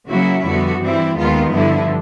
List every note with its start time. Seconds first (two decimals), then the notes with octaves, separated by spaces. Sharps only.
0.09 C#3 F#3 A#3 C#4 E4 F#4
0.46 F2 D3 G3 B3 F#4
0.81 G2 E3 G3 C4 E4
1.18 D#2 D#3 G#3 B3 F4
1.53 G2 D3 F3 E4